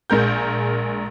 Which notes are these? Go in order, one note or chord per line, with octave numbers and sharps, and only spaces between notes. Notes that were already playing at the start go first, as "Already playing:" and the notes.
A#1 G#3 A#4 G6